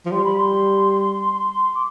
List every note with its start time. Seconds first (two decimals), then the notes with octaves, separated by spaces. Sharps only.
0.06 F3
0.12 G3 C6
0.24 B5
0.37 C6
1.74 D6